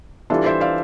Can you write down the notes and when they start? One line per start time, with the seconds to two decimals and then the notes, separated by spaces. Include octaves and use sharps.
0.30 E3 G3 D4 F4 A4
0.46 C5 E5
0.61 D5 F5